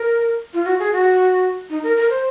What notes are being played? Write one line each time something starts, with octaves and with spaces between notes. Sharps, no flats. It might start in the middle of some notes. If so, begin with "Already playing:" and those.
Already playing: A#4
F4
F#4
G#4
F#4
D#4
A#4
A#4
C5